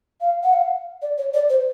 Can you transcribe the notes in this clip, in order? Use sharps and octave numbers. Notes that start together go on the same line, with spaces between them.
F5
F#5
F5
D5
C#5
D5
C5